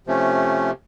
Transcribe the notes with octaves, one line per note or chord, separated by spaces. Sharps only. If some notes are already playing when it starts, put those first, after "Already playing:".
C3 F3 A3 C#4